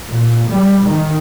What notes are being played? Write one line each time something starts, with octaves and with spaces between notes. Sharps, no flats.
A#2
G3
D#3